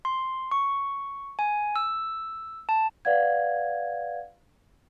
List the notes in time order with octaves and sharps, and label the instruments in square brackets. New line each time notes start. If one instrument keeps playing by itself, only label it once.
[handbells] C6
C#6
G#5
E6
A5
[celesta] B4 D5 F5 F#5 G#6